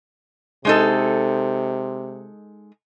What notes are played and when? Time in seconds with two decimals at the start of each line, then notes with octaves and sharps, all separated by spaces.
0.65 C3 G#3 D#4 A4